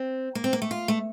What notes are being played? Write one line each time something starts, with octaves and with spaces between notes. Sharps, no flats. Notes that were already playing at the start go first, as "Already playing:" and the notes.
Already playing: C4
A#3
C4
A#3
A3
F4
A3